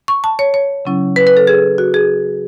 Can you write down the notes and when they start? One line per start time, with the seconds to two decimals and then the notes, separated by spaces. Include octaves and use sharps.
0.08 C#6
0.24 A5
0.39 C#5
0.54 C#5
0.85 C#3 F#3 C#4 E4
1.16 B4
1.27 B4
1.37 A4
1.47 G#4
1.78 F#4
1.94 G#4